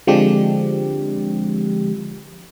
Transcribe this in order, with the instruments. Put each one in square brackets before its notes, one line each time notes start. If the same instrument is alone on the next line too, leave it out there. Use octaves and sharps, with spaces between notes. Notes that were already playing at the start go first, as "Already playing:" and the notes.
[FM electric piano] D3 F3 G#3 C4 D4 G4